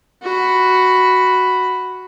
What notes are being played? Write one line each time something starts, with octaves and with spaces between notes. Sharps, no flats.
F#4 B5